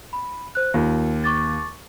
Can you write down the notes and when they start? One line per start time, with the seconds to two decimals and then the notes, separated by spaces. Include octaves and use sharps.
0.13 B5
0.55 C5 F#6
0.74 D#2 F4
1.24 C#6 D6 A6